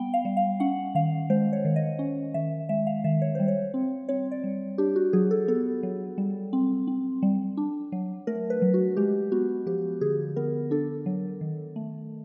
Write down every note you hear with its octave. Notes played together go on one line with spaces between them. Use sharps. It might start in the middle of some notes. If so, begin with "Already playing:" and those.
Already playing: G3 B3 G5
F5
G3
F5
C#4 F#5
D#3 F5
G#3 C5
C#5
D#3
D#5
C#4
D#3 E5
G#3 E5
F5
D#3 E5
C#5
G3 C5
C#5
C4
C4 C#5
D5
G3
D4 G4
F#4
F#3 G#4
A4
B3 A4
F#3
G3
C4
C4
G3
D4
F#3
A3 A#4
B4
F#3
F#4
G#3 G4
B3 F#4
F3 G4
D3 G#4
B3 A#4
D4 A4
F#3
D#3
A3